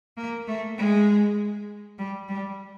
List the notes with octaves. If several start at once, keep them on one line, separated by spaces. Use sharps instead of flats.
A#3
A3
G#3
G3
G3